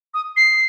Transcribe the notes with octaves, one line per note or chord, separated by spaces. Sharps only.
D#6
C7